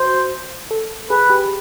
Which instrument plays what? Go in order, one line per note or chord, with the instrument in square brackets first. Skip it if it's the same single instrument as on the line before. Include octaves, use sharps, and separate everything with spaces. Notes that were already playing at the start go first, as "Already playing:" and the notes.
Already playing: [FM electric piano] F#4 [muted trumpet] C5
[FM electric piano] A4
[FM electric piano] G#4 [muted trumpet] B4
[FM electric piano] G4